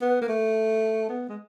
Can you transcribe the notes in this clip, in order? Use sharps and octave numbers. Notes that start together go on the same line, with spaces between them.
B3
A#3
A3
B3
G#3